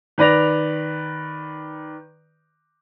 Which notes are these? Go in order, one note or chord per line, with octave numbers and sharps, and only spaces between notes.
D#3 B4 D5 A#6 F7